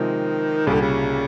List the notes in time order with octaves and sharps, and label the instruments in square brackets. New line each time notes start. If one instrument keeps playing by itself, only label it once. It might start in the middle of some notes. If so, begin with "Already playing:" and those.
Already playing: [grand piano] C3 F3 G#3 C4 [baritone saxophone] D#3
[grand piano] C2 A#2 G3 [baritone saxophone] C#3
[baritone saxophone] D3
C#3